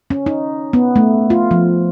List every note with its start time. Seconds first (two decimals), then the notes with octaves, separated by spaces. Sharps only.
0.10 C#4
0.26 D#4
0.73 B3
0.96 A3
1.30 F4
1.51 F3